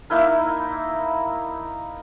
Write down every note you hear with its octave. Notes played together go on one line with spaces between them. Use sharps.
A#3 D#4 E4 A#4